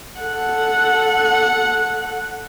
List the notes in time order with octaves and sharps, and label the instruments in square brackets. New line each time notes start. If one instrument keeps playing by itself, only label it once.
[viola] A4 F#5